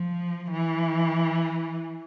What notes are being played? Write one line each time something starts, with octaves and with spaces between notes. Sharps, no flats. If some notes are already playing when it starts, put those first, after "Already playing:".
Already playing: F3
E3